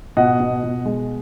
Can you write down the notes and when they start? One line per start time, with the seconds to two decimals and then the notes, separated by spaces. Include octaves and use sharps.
0.17 B2 D#5 F#5
0.40 B2
0.63 B2
0.85 G#3